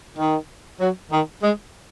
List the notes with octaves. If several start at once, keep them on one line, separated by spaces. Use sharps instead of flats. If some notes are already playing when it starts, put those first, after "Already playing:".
D#3
F#3
D#3
G#3